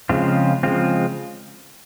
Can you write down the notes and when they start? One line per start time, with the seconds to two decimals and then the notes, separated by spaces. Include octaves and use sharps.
0.09 C#3 F3 G#3 C4 F4
0.63 C#3 F3 G#3 C4 F4